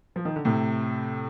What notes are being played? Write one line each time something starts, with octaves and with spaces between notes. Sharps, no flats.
F3
D#3
D3
A2 C3